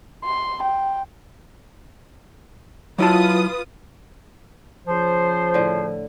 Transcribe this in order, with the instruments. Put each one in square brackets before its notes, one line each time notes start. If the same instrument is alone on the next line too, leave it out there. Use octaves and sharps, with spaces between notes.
[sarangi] C6
G5
[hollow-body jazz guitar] F#3 E4 A5 [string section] F4 B4 D#6
[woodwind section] C#3 F4 C5 [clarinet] F3
[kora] A2 D3